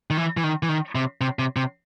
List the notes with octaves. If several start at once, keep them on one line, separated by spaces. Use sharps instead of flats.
D#3
E3
E3
D#3
E3
D#3
C3
C3
C3
C3